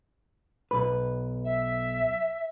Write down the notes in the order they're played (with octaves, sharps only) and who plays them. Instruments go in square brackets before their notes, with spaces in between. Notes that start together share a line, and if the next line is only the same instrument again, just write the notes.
[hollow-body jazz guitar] B1 B4
[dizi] E5